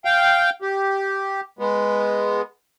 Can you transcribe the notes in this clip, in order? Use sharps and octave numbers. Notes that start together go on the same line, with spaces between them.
F5 G5
G4
G#3 B3